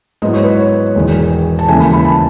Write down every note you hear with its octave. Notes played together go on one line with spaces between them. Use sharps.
G#2 F#3 B3 E4 D#5
C#5
B4
C#5
E1 E2 D#3
A5
E1 D#2 C#3 E3 A3 G#5
B5
B5
A5